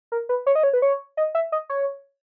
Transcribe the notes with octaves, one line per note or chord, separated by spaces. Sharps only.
A#4
B4
C#5
D#5
C#5
B4
C#5
D#5
E5
D#5
C#5